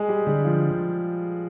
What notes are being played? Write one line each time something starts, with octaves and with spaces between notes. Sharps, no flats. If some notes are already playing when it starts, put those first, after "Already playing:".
Already playing: G#3 G#4
G3 G4
D3 G3 G4
F3 F4